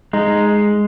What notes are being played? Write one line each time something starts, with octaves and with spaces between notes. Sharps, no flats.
G#3 D#4